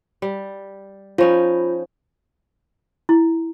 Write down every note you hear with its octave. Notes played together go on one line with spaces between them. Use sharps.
G3
F3 C#4 D#4 F4
E4